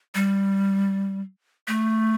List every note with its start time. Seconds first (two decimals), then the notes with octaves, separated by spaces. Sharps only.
0.15 G3
1.68 A3